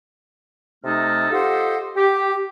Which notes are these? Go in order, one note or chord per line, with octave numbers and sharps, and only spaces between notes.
C3 A3 D#4 A4 D#5 F6
F4 G4 A4 C5 D#5 F#5
G4